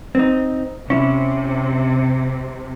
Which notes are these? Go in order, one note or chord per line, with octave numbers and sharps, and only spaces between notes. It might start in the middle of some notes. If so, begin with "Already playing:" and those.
C4 D#4
C3 C#4 E4